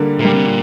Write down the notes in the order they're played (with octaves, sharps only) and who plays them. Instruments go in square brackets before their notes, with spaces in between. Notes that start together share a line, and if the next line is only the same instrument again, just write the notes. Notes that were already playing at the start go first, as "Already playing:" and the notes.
Already playing: [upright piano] D3 G3 A#3
[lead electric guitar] A#2 [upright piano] G3 A#3
[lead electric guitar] C3
A#2